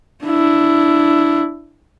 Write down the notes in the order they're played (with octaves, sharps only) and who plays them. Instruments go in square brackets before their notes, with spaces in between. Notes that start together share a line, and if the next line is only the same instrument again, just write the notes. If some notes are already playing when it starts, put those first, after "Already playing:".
[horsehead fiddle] D4 E4